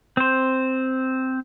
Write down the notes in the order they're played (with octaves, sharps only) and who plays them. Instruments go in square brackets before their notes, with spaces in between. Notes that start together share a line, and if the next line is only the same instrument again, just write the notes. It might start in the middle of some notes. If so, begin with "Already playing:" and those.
[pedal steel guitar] C4 C5